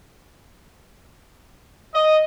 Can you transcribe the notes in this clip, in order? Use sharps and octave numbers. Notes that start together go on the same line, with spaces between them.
D#5